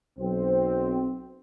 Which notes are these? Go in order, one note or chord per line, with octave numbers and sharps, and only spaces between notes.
B1 C4